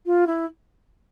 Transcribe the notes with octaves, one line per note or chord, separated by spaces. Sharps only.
F4
E4